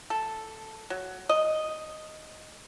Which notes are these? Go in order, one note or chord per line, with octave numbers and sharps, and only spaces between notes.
A4
F#3
D#5